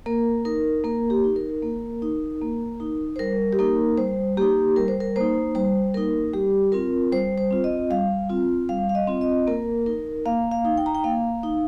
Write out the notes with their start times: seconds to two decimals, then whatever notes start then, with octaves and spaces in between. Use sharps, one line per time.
0.06 A#3 A#4
0.45 D#4 A#4
0.84 A#3 A#4
1.10 G4
1.24 D#4
1.36 A#4
1.62 A#3
2.02 D#4
2.41 A#3
2.80 D#4
3.16 C5
3.19 G3 A#4
3.52 G4
3.59 A#3 D#4 A#4
3.98 G3 C5
4.37 A#3 D#4 G4
4.76 G3 A#4
4.88 C5
5.00 A#4
5.16 A#3 D#4 C5
5.55 G3 C5
5.94 A#3 D#4 A#4
6.33 G3 G4
6.72 C4 F4 A#4
7.12 G3 C5
7.38 C5
7.51 C4 F4
7.64 D#5
7.90 G3 F5
8.30 C4 F4
8.69 G3 F5
8.89 F5
8.95 D#5
9.07 C4 F4
9.21 D#5
9.47 A#3 A#4
9.86 D#4 A#4
10.26 A#3 F5
10.51 F5
10.65 D#4
10.78 G5
10.86 A#5
10.95 G5
11.04 A#3 F5
11.43 D#4